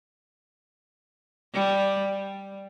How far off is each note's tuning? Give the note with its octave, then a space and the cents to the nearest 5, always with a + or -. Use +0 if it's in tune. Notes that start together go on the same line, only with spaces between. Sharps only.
G3 +0
G3 +0